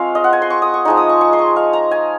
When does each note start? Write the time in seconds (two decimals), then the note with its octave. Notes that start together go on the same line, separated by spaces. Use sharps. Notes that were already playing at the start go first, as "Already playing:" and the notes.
Already playing: G#3 C4 F4 F5 C#6
0.15 D#5
0.24 F#5
0.33 G#5
0.42 C6
0.50 C#6
0.62 D#6
0.74 C#6
0.85 F3 G#3 D#4 C#6
0.97 D#6
1.09 C#6
1.21 C#6
1.33 C6
1.39 C#6
1.56 F5
1.73 A#5
1.91 G#5